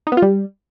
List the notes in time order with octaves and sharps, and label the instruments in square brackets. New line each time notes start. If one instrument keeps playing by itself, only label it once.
[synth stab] D#4
B3
F4
G3